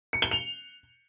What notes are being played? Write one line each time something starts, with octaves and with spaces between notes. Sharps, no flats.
C#7
G7
F7